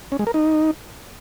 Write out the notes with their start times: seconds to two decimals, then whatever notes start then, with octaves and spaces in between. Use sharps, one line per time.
0.12 C#4
0.19 G#3
0.27 A#4
0.34 D#4